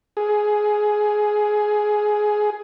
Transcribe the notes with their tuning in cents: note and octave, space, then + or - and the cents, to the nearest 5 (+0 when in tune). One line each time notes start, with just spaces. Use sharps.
G#4 +15